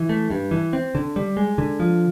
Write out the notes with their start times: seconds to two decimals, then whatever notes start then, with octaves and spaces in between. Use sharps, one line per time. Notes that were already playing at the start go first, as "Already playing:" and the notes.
Already playing: E3
0.09 A3
0.30 G2
0.51 E3
0.73 C4
0.95 D3
1.16 G3
1.37 G#3
1.58 D3
1.80 F3